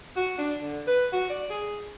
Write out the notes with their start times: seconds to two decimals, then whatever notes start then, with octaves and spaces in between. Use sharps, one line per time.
0.16 F#4
0.38 D4
0.62 D3
0.87 B4
1.13 F#4
1.30 D5
1.50 G#4